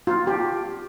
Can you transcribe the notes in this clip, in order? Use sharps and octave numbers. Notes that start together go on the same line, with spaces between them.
F4
G4